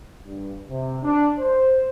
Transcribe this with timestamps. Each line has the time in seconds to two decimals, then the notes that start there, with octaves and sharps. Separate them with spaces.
0.25 G2
0.69 C3
1.03 D4
1.38 C5